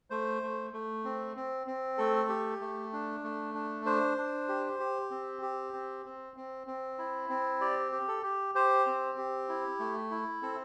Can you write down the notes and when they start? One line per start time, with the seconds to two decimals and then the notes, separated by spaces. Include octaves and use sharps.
0.10 A3 C5
0.43 A3
0.73 A3
1.04 C4
1.36 C4
1.67 C4
1.98 A3 A4
2.29 G4
2.61 A3
2.93 D4
3.24 A3
3.54 D4
3.85 D4 C5
4.18 D4
4.49 G4
4.79 G4
5.11 C4
5.42 G4
5.73 C4
6.05 C4
6.37 C4
6.67 C4
6.98 E4
7.30 C4
7.61 G4 D5
7.92 G4
8.08 A4
8.23 G4
8.55 G4 C5
8.86 C4
9.18 G4
9.49 E4
9.80 A3
10.11 E4
10.42 C4 A4